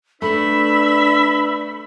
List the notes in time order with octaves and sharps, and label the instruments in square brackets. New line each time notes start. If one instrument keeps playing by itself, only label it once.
[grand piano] A3 [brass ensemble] D4 B4 [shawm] E5 [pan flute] B5